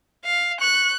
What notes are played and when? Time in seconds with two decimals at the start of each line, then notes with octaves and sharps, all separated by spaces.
0.25 F5
0.61 C#6 F#6